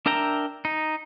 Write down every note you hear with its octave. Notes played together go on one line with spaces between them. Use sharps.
D4 A#4 E5 G5 A#5
D#4